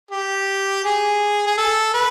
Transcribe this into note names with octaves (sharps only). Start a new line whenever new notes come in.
G4
G#4
G#4
A4
B4